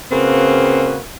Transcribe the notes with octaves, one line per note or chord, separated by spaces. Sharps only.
C#3 A#3 C4 F#4 B4